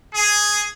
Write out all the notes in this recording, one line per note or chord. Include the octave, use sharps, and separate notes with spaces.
G#4